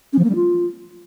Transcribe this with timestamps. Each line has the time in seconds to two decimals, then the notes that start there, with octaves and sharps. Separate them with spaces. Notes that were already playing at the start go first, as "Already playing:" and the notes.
0.13 C#4
0.18 F3
0.24 A#3
0.30 G3
0.35 F4